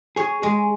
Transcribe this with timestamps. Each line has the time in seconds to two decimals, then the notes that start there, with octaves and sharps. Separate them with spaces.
0.16 G#4 C#5
0.42 G#3 G#4